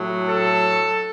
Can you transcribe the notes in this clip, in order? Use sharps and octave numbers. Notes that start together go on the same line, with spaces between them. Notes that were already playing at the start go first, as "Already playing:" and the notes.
Already playing: A2 F#3
A4